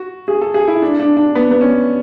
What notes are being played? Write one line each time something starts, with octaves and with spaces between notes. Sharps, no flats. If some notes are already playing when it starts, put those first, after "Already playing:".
Already playing: F#4
G#4
A4
G#4
E4
D4
D4
D4
B3
B3
C#4